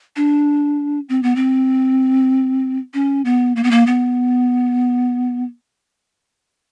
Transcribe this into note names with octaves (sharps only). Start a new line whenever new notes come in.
D4
C4
B3
C4
C#4
B3
A#3
B3
A#3
B3